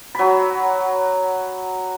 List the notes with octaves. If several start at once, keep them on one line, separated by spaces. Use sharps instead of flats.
F#3 B5